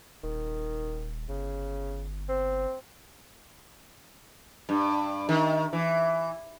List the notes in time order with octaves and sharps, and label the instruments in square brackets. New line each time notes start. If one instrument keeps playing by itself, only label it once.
[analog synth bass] D#1 [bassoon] D#3
[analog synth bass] G1 [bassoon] C#3
[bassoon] C4
[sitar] G2
D#3
E3